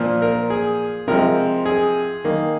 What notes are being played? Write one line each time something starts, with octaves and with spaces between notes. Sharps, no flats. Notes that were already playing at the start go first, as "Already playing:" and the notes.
Already playing: A#2 F3 A#3
A#4
G#4
C3 F3 G#3 A#4
G#4
D#3 A#3